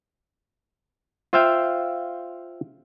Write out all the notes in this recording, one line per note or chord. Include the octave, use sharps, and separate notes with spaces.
F4 C5 E5 F5 G5